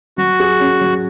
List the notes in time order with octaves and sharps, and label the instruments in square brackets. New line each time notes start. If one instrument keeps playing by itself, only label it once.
[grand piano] F#3 [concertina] F#4
[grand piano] G#4
C#4
F#3